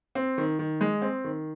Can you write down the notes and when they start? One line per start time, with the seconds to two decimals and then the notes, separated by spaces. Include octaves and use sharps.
0.15 C4
0.38 D#3
0.59 D#3
0.81 G#3
1.02 C4
1.24 D#3